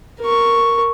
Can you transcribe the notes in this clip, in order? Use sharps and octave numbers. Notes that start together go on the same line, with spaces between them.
A#4 C#6